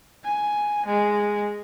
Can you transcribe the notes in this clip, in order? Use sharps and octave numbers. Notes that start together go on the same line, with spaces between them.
G#5
G#3